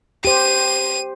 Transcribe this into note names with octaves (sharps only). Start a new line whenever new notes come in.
G4 C5 D#7